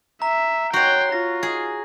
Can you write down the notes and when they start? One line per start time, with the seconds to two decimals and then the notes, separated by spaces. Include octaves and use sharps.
0.22 E5 A#5
0.73 F#4 C#5 G5 C6
1.12 F4 A#6
1.43 G#4